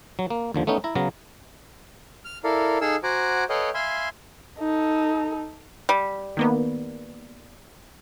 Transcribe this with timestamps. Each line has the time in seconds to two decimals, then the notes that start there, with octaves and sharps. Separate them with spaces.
0.19 F#3
0.30 A#3
0.54 D#2 D3 F3
0.67 A3 B3 C#4 D#4
0.84 E4 A#5
0.95 C#3 F#3 B3 F5 A#5
2.25 F6
2.44 E4 A4 A#4 D5 F5
2.81 D#4 G#4 A4 F5 G#5 E6
3.03 F#4 C5 F#5 G#5 A#5 D6
3.49 A4 B4 C#5 D#5 F5 G5
3.74 E5 F5 G#5 B5 C6
4.59 D#4 A4
5.89 G3
6.37 D#3 A#3 B3